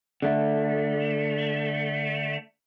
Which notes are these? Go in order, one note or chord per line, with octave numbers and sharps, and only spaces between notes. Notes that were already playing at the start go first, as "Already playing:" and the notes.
D3 A3